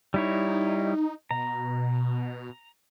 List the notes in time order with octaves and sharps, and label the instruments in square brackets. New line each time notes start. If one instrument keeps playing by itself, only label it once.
[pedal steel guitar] G3 E4 C#5 [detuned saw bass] D#4
[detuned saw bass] B2 [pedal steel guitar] A#5